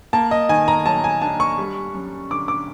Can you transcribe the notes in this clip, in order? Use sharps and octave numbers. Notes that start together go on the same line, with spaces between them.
A#3 A5
D#5
D#3 G#5
A#5
F#3 A5
G#5
D4 A5
C#6
G3
F#2
D3 D6
D6